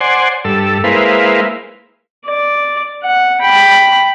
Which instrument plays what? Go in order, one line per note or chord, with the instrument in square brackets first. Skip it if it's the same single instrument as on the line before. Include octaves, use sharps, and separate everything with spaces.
[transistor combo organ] C5 D5 F#5 G#5 C6
G2 A4 E6
G#3 A#3 E4 B4 C5 F5
[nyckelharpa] D5
F#5
G5 B5